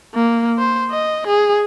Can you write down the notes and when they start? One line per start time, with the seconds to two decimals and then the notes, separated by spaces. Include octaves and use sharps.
0.15 A#3
0.59 C5
0.91 D#5
1.28 G#4